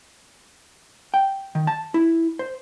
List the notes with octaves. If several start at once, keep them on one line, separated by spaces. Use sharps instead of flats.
G5
D#3
A5
E4
C5